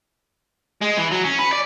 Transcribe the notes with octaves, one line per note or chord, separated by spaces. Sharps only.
G#3
E3
F#3
C#4
B4
D5